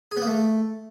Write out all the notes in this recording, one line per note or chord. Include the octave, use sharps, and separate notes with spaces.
G#4
B3
A#3
A3